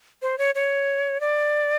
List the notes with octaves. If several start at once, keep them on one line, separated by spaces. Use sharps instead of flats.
C5
C#5
C#5
D5